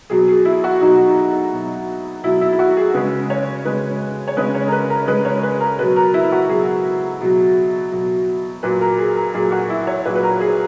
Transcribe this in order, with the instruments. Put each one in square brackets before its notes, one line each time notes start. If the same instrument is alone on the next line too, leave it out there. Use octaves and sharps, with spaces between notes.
[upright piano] B2 F#3 G#4
G#4
E4
F#4
B2 F#3 D#4
D#4
B2 F#3
B2 F#3 E4
E4
E4
F#4
G#4
C#3 G#3 B4
C#5
C#3 G#3 B4
C#5
C#3 G#3 B4
C#5
A#4
B4
A#4
C#3 G#3 B4
C#5
B4
A#4
B2 F#3 B4
A#4
E4
E4
F#4
B2 F#3 G#4
B2 F#3
B2 F#3
A#2 F#3 B4
A#4
G#4
A#4
A#2 F#3 G#4
F#4
E4
C#5
A#2 F#3 B4
B4
A#4
G#4